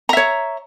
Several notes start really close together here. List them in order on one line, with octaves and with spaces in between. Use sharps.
A#5 E5 C#5